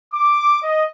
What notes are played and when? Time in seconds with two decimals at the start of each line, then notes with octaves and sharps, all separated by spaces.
0.12 D6
0.63 D#5